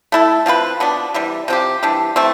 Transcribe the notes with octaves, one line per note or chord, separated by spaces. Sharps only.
A3 E4 A4
F3 C4 G4 B4
B2 B3 D4
C3 E3 G3
C3 F3 C4 G4
E3 G3 D4
E3 A3 C4